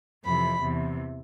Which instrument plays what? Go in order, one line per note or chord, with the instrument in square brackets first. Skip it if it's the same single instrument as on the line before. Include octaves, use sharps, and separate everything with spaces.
[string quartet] F2 C3 E3 B5
E2 C3 E3